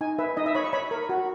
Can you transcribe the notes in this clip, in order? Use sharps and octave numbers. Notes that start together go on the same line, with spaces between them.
D#4 G#5
B4 E5
D#4 D#5
E5
C#5 B5
C#6
C#5 B5
A#4
F#4